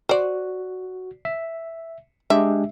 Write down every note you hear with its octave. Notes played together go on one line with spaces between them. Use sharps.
F#4 C5 D5
E5
G#3 D4 G4 E5